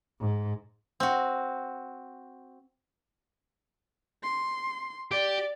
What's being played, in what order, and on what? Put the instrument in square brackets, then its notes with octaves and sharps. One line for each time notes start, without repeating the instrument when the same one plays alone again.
[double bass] G#2
[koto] C4 F#4
[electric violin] C6
[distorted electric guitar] G4 [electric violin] D5